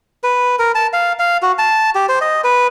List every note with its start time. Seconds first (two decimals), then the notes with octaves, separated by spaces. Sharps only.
0.23 B4
0.59 A#4
0.75 A5
0.93 F5
1.19 F5
1.42 F#4
1.58 A5
1.95 G4
2.09 C5
2.21 D#5
2.44 B4